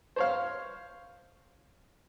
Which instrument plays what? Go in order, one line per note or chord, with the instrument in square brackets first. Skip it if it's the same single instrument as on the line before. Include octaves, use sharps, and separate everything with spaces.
[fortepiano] C5 C#5 F5